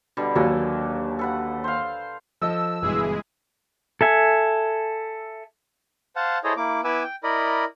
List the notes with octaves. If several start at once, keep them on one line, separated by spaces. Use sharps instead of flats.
B2 D3 G3
D#2 F#3 A#3 A4 G#5
A4 B4 F#5
C5 F5
F3 A4 D#5 E6
G1 B2 E3 G#3 E4 G#4
A4 E5 G#5
C5 F5 F#5 A5
E4 G#4 A4 C5 C#5 D#5
A#3 E4 D6
B3 E4 B4 G#5 D6 E6
G5
E4 A#4 D5 D#5 B5